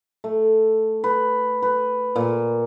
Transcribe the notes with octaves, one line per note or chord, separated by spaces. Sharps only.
A3
B4
B4
A#2